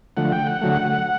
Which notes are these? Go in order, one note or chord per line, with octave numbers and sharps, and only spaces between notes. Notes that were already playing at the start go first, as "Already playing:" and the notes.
D3 F3 A3 F#5
G5
F#5
D3 F#3 A3